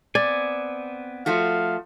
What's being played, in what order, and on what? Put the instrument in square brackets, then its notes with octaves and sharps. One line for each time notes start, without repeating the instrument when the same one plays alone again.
[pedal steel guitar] B3 C4 G#5 [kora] D5
[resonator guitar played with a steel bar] F3 A3 F#4 [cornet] F5